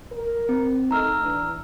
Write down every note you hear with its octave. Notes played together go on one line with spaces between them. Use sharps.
A#4
C4
A3 D#4 A#5 E6 F6
E3 D4